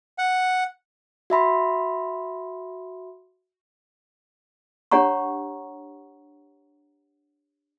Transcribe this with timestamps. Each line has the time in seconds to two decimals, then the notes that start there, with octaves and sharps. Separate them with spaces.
0.18 F#5
1.30 F#4 E5 B5 C6
4.91 D4 G4 C#5 F#5 A#5 C#6